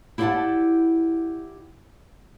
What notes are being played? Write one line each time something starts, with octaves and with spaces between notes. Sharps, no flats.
E4 G4 D5 F5 F#5 A5